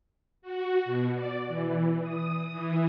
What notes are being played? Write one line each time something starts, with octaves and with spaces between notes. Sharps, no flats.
F#4
B2
D5
E3
D#6
E3